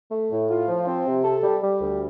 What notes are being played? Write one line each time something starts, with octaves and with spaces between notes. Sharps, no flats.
A3
A2
F4
F3
C4
C3
A4
G3
G3
D2